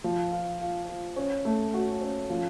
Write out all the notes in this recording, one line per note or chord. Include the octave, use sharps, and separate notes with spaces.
F3
F4
F4
F4
C#4
A3
F#4
C#4
F3